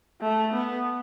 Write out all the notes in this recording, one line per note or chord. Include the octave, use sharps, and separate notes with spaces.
A3
B3